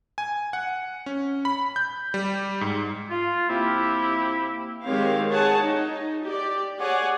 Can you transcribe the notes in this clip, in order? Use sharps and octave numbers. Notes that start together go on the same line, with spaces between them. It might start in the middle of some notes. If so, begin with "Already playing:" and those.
G#5
F#5
C#4
B5
G6
G3
G#2
F4
C3 A#3 E4 G4
D#3 G#3 C4 G4 C#5 F5
G#4 C#5 F#5 A5
D#4
G4 D5
G#4 C#5 D5 F#5 G#5